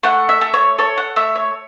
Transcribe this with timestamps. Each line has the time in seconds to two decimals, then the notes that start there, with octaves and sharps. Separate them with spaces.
0.03 A3 F#5
0.29 E5
0.41 A3
0.54 C#5
0.79 A4 C#5
0.97 F#5
1.16 A3 E5
1.35 C#5